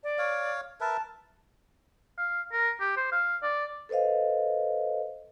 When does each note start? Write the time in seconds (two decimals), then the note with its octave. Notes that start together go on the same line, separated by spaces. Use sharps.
0.03 D5
0.18 C#5 F5
0.80 A#4 B4 E5 A5
2.18 F5
2.52 A#4
2.80 G4
2.97 C5
3.12 F5
3.43 D5
3.89 A4 B4 C5 D#5 F5